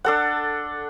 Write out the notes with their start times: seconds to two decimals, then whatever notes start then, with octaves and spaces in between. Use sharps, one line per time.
0.04 D4 A4 F#5